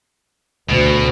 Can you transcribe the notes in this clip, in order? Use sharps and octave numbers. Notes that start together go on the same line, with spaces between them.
D2 B2